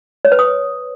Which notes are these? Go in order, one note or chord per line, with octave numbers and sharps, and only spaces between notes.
C#5
B4
D#6